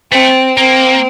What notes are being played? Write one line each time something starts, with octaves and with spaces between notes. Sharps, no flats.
A3 C4
A#3 C4